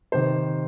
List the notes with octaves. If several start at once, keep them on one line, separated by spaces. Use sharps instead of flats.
C3 D#3 C5